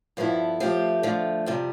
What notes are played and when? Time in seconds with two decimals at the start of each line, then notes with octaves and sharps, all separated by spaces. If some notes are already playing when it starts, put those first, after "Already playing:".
0.17 G2 F3 B3 E4 A4
0.60 F3 A3 C4 G4
1.03 D3 F3 A3
1.46 F2 C3 G3